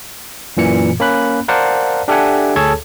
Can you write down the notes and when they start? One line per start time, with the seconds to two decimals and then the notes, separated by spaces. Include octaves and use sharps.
0.57 F#2 A#2 E3 C#7
1.00 A#3 C#4 B5 F#6
1.48 A#4 C5 D5 F5 F#5 A5
2.08 D4 G4 A4 E5 F#5 G#5
2.56 D2 G#4 A4 C#5 A5 G#6